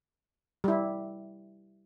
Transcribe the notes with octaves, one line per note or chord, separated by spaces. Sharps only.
G3 E4